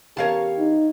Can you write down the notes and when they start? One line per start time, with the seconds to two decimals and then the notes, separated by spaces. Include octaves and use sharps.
0.17 E2 C#4 G4 A#4 C#5 F5 A5
0.58 D#4